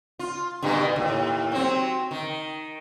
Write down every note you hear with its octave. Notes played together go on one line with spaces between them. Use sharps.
F4
G2 B2 D#3
D#2 A2
F#3 C4
D#3